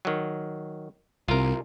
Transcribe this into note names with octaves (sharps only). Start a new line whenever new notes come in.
D#3 F#3
C2 C3 F4 A#4